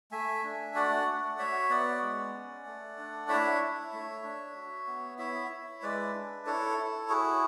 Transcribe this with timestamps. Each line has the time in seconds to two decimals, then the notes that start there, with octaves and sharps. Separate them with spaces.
0.11 A3 E5 G#5
0.44 D4
0.75 F#4 D5 F#5
1.06 A3
1.38 F#4 C#5 E5
1.70 B3 D5 F#5
2.02 G#3
2.34 C#4
2.66 A3
2.98 D4
3.28 E4 C#5 E5
3.61 E4
3.93 A3
4.23 D4
4.55 F#4
4.87 B3
5.19 E4 C#5 E5
5.50 E4
5.82 G#3 B4 D5
6.14 D4
6.46 E4 A4 C#5
6.78 E4
7.09 F#4 G#4